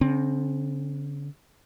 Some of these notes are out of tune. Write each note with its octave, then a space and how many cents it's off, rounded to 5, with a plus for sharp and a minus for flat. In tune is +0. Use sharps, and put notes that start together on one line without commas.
D3 -45 C4 +15